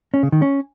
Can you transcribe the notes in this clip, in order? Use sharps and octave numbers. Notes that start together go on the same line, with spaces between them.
C#4
C#3
D#3
C#4